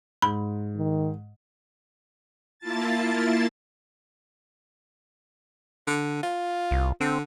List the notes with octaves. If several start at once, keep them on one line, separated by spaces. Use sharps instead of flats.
G#2 B5
D#3
A#3 E4 F4 A5 A6
D3
F4
C2
D3 C4